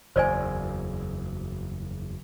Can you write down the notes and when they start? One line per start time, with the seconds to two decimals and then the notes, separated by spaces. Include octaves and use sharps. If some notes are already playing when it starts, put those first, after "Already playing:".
0.16 F#1 E2 C5 D5 G#5